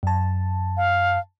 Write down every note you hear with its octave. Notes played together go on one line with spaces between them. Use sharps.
F#2 A5
F5